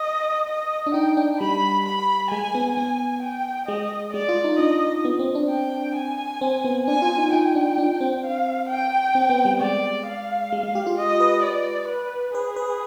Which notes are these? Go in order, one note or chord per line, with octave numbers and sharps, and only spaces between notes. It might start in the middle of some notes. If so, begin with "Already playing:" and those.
Already playing: D#5
D#5
D4
D#4 G5
D4
G3 B5
B5
G#3 G#5
B3
B3 G#5
G5
G#3 D#5
G#3 D5
F4
D#4
D4 D#5
B3
C4
D4
G5
G#5
C4
B3
D4 G#5
F4
D#4
D#4 G5
D4
D4
C4
F5
G5
C4
B3
G3
G#3 D5
F5
G#3
G#3
G4
F4
D#5
B4
D5
B4
G#4 B4
B4